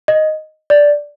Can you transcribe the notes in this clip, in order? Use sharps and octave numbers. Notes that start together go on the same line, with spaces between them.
D#5
D5